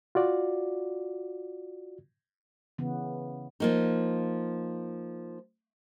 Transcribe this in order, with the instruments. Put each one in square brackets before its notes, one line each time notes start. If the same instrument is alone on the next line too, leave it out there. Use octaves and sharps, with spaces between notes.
[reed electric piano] F4 F#4 D5
[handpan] C#3 E3 B3
[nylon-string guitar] F3 A#3 D#4